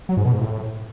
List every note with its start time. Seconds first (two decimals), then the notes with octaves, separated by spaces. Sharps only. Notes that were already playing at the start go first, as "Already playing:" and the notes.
0.09 F#3
0.17 G#2
0.25 B2
0.33 G#2
0.41 A2